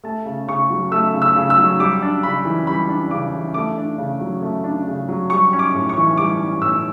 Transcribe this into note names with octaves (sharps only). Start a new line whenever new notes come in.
A3 A5
C#3
C#3 C#6
F#3
A3 E6
C#3
E6
C#3
E6
F#3
G3 D6
D4
C#3 B5
E3
G3 B5
D4
C#3 D6
E3
A3 D6
D4
C#3
F#3
A3
D4
C#3
F#3
G3 C#6
C#4
D6
A2
C#6
E3
G3 D6
C#4
A2 E6